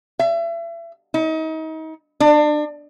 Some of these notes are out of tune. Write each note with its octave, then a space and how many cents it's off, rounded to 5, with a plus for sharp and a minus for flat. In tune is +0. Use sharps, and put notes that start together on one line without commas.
E5 +35
D#4 +35
D4 +30